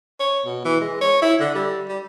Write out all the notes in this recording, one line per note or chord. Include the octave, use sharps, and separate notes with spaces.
C#5
B2
E3
G#3
C#5
E4
D3
G3
G3